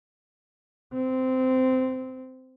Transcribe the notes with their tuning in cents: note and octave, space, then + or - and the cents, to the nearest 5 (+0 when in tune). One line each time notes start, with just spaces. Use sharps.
C4 -15